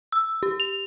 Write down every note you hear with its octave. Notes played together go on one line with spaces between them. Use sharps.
E6
G4
F7